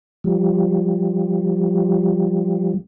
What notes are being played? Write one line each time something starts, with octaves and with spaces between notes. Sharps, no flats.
F3 G3